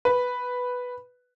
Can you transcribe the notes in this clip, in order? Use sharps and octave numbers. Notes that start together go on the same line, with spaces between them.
B4